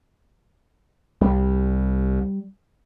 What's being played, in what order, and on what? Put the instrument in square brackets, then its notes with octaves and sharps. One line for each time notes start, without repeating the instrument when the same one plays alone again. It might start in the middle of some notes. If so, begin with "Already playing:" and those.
[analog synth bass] C2 [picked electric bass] G3